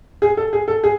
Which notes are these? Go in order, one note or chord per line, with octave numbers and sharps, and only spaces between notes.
G#4
A4
G#4
A4
G#4